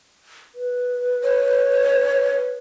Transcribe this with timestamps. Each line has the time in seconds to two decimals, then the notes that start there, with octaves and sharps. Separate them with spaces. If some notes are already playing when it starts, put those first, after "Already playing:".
0.55 B4
1.23 C#5